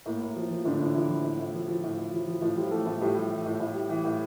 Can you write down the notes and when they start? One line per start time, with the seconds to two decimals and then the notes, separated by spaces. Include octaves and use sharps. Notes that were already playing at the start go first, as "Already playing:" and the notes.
0.06 A2 A#3
0.21 A2
0.36 F3
0.50 F3
0.65 A2 D3 D4
0.80 A2
0.94 E3 F3 E4
1.10 F3
1.24 A2
1.39 A2
1.53 F3
1.68 F3
1.84 A2
1.98 A2
2.13 F3
2.27 F3
2.41 A2 F3 F4
2.56 F3 G3 F4
2.71 E3 A3 A4
2.86 A2 A3 A4
3.01 A2 G3 G4
3.15 G3
3.30 E3
3.45 A2
3.60 A2
3.74 G3
3.89 E3
4.05 A2